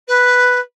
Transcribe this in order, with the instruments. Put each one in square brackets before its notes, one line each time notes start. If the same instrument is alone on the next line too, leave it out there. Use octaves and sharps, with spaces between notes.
[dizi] B4